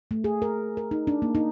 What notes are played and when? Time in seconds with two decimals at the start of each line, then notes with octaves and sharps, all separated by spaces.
0.11 A3
0.24 G#4
0.42 A#4
0.77 A#4
0.91 D#4
1.07 D4
1.22 A#3
1.35 D#4